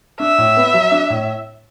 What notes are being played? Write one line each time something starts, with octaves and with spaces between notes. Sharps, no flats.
D4 E5
A2
B3
F#3
D4
A2